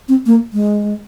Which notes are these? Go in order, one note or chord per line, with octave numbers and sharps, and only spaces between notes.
C4
A#3
G#3